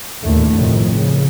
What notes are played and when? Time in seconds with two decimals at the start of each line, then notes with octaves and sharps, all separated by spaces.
0.22 D#2 A2 D3 A3
0.55 F2 A2 C3 D#3
0.84 C#3